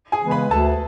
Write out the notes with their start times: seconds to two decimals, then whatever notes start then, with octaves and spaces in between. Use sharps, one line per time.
0.12 G#4 G#5
0.22 C#3 E3 G#3 B3
0.31 B4 B5
0.51 D2 A4 A5